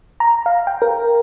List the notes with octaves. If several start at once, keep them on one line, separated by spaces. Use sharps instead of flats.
A#5
F5
G5
A#4